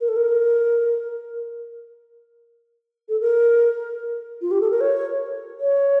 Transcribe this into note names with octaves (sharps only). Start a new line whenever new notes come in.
A#4
A4
A#4
A4
A#4
F4
G4
A4
A#4
C#5
C#5